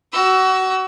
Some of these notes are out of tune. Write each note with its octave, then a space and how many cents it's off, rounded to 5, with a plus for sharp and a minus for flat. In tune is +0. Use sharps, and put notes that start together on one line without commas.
F#4 +25 E6 +0